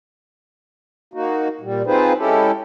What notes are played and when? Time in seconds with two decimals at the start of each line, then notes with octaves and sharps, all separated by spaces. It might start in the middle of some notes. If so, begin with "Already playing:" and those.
1.14 A#3 D#4 F#4
1.61 A#2 G3
1.86 C4 D#4 F4 G#4 B4 C5
2.18 G#3 C#4 E4 G4 A4